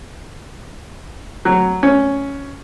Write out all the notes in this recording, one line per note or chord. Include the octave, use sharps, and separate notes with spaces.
F#3
C#4